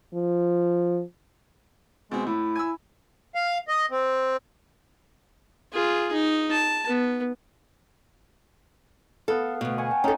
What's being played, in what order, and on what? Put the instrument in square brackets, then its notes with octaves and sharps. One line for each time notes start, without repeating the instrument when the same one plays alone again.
[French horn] F3
[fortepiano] B2 C4 [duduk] G#3
[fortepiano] A2 [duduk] E4
[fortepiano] G#5 E6
[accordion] F5
D#5
C4
[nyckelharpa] F4 G#4
D#4
A5
B3
[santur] B3 F5 [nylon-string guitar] A4
[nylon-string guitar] D2 B2
[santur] F#5 G#5 C#6
G5 A5
[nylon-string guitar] C#4 A4 [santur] D#4 G5 G#5